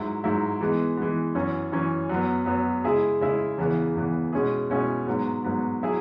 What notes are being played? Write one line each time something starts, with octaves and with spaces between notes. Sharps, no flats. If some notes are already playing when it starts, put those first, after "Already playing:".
Already playing: G#2 F#3 E4
G#2 F#3 E4
E3 G#3 B3
E3 G#3 B3
F#2 E3 C#4
F#2 E3 C#4
F#2 F#3 B3
F#2 F#3 B3
C#3 G#3 E4 G#4
C#3 G#3 E4 G#4
E2 C#3 E3 B3
E2 C#3 E3 B3
B2 G#3 C#4 E4 G#4
B2 G#3 C#4 E4 G#4
G#2 F#3 B3
G#2 F#3 B3
F#3 E4 G#4